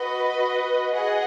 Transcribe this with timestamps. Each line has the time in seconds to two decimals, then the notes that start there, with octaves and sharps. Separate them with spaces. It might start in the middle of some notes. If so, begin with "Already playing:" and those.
Already playing: F#4 B4 D#5
0.93 G#4 D#5 F#5